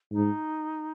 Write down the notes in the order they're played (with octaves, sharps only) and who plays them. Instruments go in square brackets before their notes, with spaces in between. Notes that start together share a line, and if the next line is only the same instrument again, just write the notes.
[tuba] G#2 [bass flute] D#4